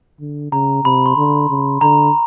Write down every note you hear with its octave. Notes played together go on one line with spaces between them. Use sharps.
D3
C#3 A#5
C3 B5
C6
D3
C#3
D3 A#5